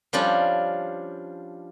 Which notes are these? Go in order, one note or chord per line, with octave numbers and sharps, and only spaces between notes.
F3 G3 C#4 D4 F4